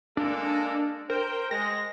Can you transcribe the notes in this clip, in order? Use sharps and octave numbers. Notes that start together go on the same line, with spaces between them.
G#3 A#3 D4 A4
A#4 C5 G5
G#3 A#6